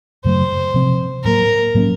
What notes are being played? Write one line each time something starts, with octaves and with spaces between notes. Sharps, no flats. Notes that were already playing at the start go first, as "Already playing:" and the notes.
F#2 C#3 F#3 A3 C5
C3 F3 C4
A2 F#3 A#3 A#4
A2 F#3 A#3 C#4